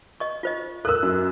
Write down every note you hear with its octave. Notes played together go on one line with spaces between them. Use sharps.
D#5 C#6
F4 C5 D#5
A4 A#4 E6 F#6
F#2